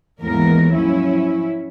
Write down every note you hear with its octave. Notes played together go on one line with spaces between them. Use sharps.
D#2 G#2 E3 G#3 B3 A#4
F3 F#3 C#4 E4